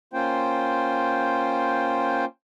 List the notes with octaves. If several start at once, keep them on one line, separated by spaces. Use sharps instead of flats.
A#3 C#4 F4 C5 G5